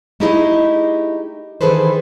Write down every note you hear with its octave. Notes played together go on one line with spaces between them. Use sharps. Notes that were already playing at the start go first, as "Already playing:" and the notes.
A3 D#4 E4 G4 G#4 D#5
D#3 E3 G#4 A4 B4 C5